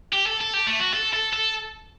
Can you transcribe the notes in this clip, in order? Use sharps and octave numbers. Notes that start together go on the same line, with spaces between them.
G4
A4
A4
G4
A3
F#4
A4
A4
A4